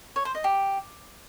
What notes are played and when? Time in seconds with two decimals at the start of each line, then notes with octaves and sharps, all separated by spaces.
0.16 C#5
0.25 C5
0.35 D#5
0.44 G4